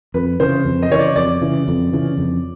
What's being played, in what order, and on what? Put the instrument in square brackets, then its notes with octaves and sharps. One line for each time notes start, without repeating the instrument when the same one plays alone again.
[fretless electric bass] F2 [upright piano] B4
[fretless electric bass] C#3 E3 [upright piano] C5
[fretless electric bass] F2
[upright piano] D#5
[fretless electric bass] C#3 E3 [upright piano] C#5
[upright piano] D5
[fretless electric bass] F2 [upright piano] D5
[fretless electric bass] C#3 E3
F2
C#3 E3
F2